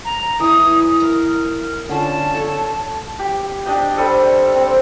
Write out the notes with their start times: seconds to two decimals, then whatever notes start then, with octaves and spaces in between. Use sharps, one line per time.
0.04 A#5
0.40 E3 E4 D#6
1.00 A#4 A#5
1.89 D3 C#4 F4 A5
2.35 A4 C#5
3.19 G4
3.66 D4 G4 D#5 G5
3.96 G3 A4 C5
4.55 C4